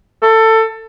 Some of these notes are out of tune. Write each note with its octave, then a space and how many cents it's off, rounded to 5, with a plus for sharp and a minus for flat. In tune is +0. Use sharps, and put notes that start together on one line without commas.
A4 +20